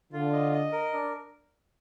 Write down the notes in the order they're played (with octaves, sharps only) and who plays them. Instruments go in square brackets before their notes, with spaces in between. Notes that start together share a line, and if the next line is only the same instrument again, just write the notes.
[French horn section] D3 [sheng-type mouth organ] F4
[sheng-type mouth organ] D#5
D#5
A#4
D4